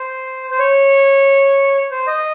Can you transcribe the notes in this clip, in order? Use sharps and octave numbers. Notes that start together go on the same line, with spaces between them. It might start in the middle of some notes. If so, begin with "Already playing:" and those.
Already playing: C5
C5
C#5
C5
D#5